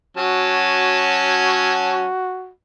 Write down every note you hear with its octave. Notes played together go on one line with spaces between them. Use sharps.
F#3 C#4 F#4 A5